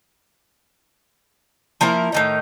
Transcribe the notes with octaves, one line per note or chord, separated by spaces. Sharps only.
F3 A#3 E4 A#4
A2 D#3 D#4